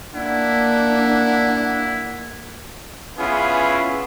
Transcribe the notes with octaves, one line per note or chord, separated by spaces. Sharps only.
A#3 D4 E4 F#5
B3 C#4 E4 F4 G#4